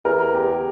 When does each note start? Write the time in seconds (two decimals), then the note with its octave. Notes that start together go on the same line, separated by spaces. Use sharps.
0.05 E2 A#4
0.35 G4